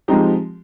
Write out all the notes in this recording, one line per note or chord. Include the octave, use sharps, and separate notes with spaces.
F3 G#3 C4 D#4 G4